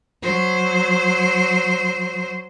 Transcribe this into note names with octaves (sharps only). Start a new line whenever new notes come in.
F#3 C5